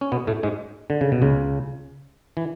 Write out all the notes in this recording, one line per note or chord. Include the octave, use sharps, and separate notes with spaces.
C#4
B2 B3
A2 A3
G#2 G#3
D3
C#3
B2
C#2 C#3
E3